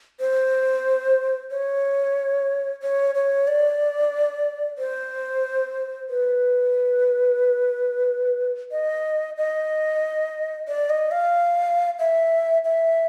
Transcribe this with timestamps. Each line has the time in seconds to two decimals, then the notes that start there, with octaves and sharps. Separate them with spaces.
0.20 C5
1.51 C#5
2.82 C#5
3.15 C#5
3.48 D5
4.78 C5
6.10 B4
8.71 D#5
9.37 D#5
10.68 D5
10.90 D#5
11.11 F5
11.99 E5
12.65 E5